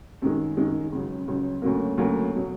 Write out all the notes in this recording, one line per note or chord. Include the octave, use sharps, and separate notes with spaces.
F#2 D#3 G#3
F#2 D#3 G#3
C#2 C#3 F#3
C#2 C#3 F#3
D2 C#3 F#3 A#3
D2 C#3 F#3 A#3
B2 F#3